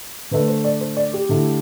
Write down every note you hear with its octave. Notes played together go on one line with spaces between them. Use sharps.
D3 A3 D4 B4
C5
D5
C5
D5
G4
D3 A3 E4